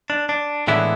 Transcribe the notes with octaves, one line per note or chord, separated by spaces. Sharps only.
D4
D4
A2 E3 G#3 B3 D4 E4